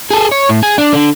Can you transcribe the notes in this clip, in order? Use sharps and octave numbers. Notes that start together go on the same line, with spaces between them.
G#4 A4
C#5
A2
G#4
D4
D3